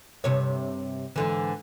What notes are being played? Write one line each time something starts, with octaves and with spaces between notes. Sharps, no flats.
G2 C3 C#5
G#2 D3 E3